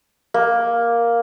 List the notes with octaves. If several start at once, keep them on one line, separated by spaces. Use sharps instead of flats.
A#3